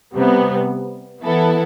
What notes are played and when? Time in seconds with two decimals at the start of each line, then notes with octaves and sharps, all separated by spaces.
0.16 C3 G3 B3
1.23 E3 B3 E4 A4